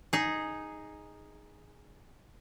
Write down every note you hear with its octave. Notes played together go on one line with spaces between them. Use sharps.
D#4 G#4